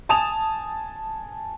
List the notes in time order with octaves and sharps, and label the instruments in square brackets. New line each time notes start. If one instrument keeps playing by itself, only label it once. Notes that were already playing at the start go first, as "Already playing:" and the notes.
[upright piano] G#5 A5 D#6 E7 F7